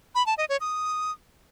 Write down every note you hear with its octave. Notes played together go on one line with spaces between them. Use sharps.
B5
A5
D#5
C#5
D#6